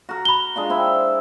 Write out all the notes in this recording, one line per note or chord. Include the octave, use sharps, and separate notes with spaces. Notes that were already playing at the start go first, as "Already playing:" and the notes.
F#4 A#4
B5 G7
G#3 D4 F4
C4 E4 E5